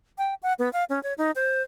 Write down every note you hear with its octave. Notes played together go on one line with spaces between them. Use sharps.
G5
F#5
B3
F5
C#4
C#5
D#4
C5